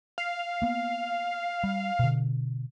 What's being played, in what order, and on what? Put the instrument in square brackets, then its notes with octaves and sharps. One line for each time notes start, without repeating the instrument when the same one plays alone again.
[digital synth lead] F5
[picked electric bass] A#3 B3
G3
B2 D3